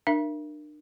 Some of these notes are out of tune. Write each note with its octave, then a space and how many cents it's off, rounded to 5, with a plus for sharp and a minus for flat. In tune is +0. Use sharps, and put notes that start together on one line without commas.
D4 +40 A#4 +0 E5 +30